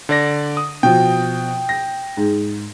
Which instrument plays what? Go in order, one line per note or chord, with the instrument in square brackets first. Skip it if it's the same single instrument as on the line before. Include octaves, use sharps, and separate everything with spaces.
[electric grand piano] D3 D5 A#6
D#6
[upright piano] B2 F3 [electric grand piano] G5
[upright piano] A#6
G#2